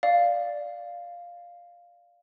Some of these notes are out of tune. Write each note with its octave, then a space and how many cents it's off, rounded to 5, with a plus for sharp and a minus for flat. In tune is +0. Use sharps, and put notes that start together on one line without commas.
D5 +0 F5 +0